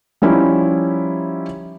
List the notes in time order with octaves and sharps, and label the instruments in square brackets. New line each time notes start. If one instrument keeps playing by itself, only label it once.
[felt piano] F3 G3 C#4 D#4 E4